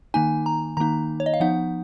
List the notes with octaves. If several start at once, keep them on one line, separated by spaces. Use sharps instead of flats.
D#3 A#3 D#4 G#5
A#5
D#3 A#3 D#4 A#5
C#5
D#5
F5
F3 B3 D#4 F#5